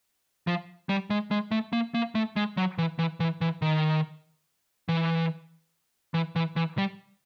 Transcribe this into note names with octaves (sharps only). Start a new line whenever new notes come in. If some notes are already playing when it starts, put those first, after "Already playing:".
F3
G3
G#3
G#3
A3
A#3
A#3
A3
G#3
F#3
E3
E3
E3
E3
D#3
E3
E3
E3
E3
G3